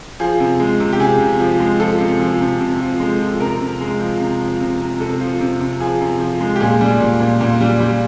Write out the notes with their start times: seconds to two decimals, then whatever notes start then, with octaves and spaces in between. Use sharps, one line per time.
0.20 F3 G#4
0.40 C3
0.60 G#3
0.80 C3
0.92 G4
1.00 C3 G#4
1.20 C3
1.40 F3
1.60 G#3
1.80 F3 A4
2.00 C3
2.20 F3
2.40 C3
2.60 C3
2.80 F3
3.00 G#3
3.20 F3
3.40 C3 A#4
3.60 C3
3.81 G#3
4.00 F3
4.20 C3
4.40 F3
4.60 C3
4.80 C3
5.00 C3 A4
5.20 F3
5.41 C3
5.60 C3
5.80 F3 G#4
6.00 C3
6.20 F3
6.40 G#3
6.56 G4
6.60 A#2 G#4
6.81 G3
7.00 A#2
7.20 A#2
7.41 A#2
7.61 G3
7.80 G3